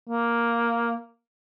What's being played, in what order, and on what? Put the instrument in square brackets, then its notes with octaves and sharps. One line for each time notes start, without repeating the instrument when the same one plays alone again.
[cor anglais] A#3